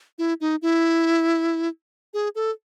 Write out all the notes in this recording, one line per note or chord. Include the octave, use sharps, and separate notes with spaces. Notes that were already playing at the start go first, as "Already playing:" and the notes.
E4
D#4
E4
G#4
A4